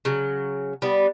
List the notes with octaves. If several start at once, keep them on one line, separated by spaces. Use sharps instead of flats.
C#3 F#3
G3 B3